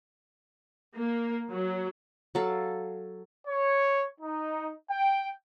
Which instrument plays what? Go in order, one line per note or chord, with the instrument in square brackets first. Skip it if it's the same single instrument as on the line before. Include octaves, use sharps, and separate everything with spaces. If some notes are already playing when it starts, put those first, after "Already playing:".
[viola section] A#3
F#3
[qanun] F#3 A4 F5
[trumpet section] C#5
D#4
G5